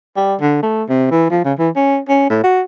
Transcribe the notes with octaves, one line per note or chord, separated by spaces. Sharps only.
G3
D3
A3
C3
E3
F3
C#3
E3
C#4
C#4
A2
F#4